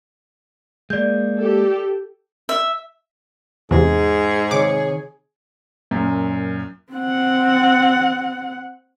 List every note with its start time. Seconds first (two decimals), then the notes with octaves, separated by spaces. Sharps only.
0.90 G#3 A#3 D5 G6
1.37 G4 A4
2.49 E5
3.71 E2 G#2 C3 G#4
4.51 C3 D#3 C#5 D6
5.91 F#2 A#2
6.93 C4 F#5